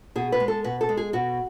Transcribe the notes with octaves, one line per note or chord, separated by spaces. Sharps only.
B2 G#4
B4
G#3
A4
B2 B4
A4
G#3
G#4
B2 F#4